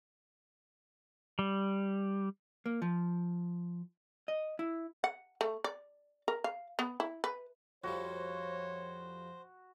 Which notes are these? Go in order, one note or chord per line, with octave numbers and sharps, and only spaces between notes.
G3
A#3
F3
D#5
E4
F#5
A3
D5
A#4
F5
B3
E4
B4
F2 F3 G3 F#4 C5 C#5